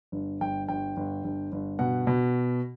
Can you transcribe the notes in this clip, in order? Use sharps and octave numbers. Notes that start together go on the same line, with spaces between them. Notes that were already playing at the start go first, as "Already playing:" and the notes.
G1
G1 G5
G1 G5
G1
G1
G1
B2 F#5
B2